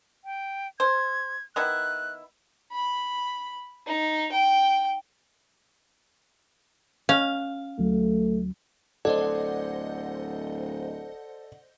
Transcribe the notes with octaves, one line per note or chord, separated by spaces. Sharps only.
G5
C5 G#6
D#3 B3 E4 F#6
B5
D#4
G5
C#4 F5
D2 F#3 A3
D1 A4 C5 D5 D#5 F#5